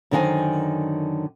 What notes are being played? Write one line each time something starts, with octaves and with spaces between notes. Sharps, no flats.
F#2 D3 D#3 C5 G5 G#5